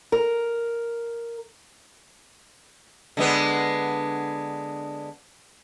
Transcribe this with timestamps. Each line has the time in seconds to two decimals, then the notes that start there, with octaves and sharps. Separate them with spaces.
0.12 A#4
3.17 D3 G#3 B3